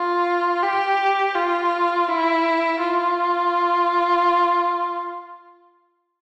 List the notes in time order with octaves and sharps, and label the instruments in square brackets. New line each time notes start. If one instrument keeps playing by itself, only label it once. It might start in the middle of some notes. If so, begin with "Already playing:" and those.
Already playing: [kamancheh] F4
G4
F4
E4
F4